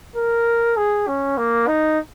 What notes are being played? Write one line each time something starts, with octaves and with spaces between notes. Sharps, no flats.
A#4
G#4
C#4
A#3
D#4